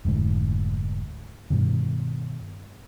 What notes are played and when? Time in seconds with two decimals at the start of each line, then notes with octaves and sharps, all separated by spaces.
0.05 F1 D2 G#2
1.50 G2 B2 D#3